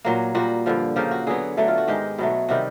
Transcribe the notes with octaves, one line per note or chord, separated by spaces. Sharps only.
A#2 F#3 A#3
A#2 G3 A#3 F#4
G2 D3 F3
C#3 F3 A#3 G4
F#4
D3 F#3 B3 G#4
D3 F#3 A3
F4
F#4
G#2 D#3 G#3 G4
B2 F#3 A3
C3 D#3 G3 F#4